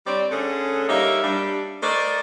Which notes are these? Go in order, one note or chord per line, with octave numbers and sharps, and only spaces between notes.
G3 C4 C#5 D5
D3 A3 C#4 G#4 A4
G3 A#3 D#4 G4 C#5 E5
G3 D4
A3 A#4 C5 D5 D#5